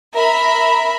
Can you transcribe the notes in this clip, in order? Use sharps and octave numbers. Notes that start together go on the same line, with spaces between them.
A#4 E5 B5